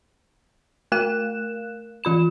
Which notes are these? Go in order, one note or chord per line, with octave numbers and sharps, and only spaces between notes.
A3 A#4 F5 F#6 E7
E3 F4 B5 E7